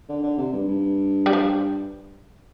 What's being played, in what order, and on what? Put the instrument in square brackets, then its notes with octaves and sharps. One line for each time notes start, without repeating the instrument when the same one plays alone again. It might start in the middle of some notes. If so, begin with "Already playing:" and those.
[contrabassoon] D3
D3
C3
G2
G2
[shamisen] G3
F3